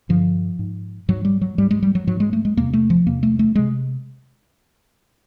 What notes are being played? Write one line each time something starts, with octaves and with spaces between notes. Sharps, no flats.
G2 D3 F3
G#2
G#2 F#3
G3
F#3
G#2 G3
G#3
G3
F#3
G#2 F#3
G#3
A3
G#3
E2 C3 A#3
A3
F3
E2 C3 A#3
A3
A3
C3 G#3